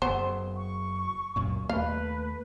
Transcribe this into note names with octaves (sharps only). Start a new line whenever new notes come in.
F#1 B3 C5
C#6
C#2 F#2 A#2
D#2 A3 A#3 B4 F5